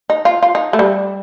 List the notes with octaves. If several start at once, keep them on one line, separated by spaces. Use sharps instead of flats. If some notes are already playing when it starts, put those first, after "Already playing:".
D#4
F4
F4
D#4
A3
G3